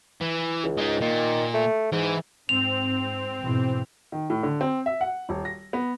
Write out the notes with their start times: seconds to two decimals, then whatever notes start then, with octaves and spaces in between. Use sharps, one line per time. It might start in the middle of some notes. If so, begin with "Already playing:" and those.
0.21 E3
0.64 C#2
0.78 G#3 D#4
1.01 A#2 D#3
1.54 A3
1.92 G#2 E3
2.49 G#2 C4 F7
3.40 G#2 B2 E3
4.12 D#3
4.30 A2
4.43 D3
4.61 C4
4.86 E5
5.01 F#5
5.29 D#1
5.45 A#6
5.73 B3